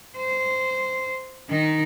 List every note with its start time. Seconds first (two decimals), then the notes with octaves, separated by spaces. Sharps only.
0.17 C5
1.50 D#3 D#4